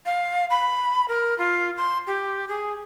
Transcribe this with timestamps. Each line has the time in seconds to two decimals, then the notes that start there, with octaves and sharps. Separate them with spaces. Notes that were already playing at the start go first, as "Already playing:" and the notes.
0.06 F5
0.50 B5
1.08 A#4
1.38 F4
1.77 C6
2.07 G4
2.48 G#4